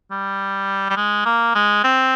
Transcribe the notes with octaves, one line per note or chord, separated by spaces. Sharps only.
G3
G3
G#3
A#3
G#3
C4